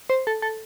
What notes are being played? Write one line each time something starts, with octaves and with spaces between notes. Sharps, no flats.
C5
A4
A4